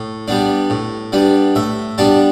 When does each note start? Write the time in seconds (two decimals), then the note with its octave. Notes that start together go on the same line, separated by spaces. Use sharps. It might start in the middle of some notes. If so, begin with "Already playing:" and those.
Already playing: A2
0.28 G3 B3 D4
0.70 A2
1.12 G3 B3 D4
1.55 A2 E5
1.98 G3 B3 D4 A5